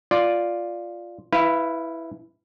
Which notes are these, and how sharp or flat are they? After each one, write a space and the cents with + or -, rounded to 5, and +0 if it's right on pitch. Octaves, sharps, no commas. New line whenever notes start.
F4 +0 D5 +0
E4 +0 B4 +0 F5 -25